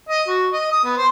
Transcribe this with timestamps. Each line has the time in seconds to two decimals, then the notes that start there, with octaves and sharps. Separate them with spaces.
0.09 D#5
0.28 F#4
0.53 D#5
0.72 D#6
0.84 B3
0.97 C5